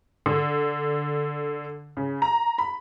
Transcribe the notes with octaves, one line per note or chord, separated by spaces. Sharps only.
D3
C#3
A#5
B5